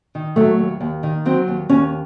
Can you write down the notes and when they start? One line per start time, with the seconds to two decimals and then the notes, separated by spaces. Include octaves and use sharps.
0.15 D#3
0.36 F#3 A3
0.59 D#2
0.81 D#2
1.03 D#3
1.25 F#3 C4
1.48 D#2
1.69 D#2 C#4